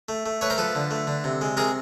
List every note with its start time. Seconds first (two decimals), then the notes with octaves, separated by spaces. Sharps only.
0.09 A3
0.26 A3
0.41 A3 B4 C#5
0.50 A#4 C5
0.58 F3 A4 B4
0.75 D3
0.91 A3
1.07 D3
1.24 C3
1.41 G#3
1.57 C3 G#4 A#4